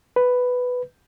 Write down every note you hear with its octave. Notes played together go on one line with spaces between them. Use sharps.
B4